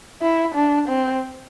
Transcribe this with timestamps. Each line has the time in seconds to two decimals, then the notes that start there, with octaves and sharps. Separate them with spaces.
0.22 E4
0.55 D4
0.88 C4